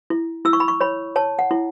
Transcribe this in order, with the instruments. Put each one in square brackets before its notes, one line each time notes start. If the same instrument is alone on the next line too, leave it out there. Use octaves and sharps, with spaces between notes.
[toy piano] E4
E4 E6
C#6
B5
C#6
C#5 B5
C#5 A5
F#5
E4